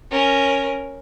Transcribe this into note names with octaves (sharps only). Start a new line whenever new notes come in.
C#4 A#4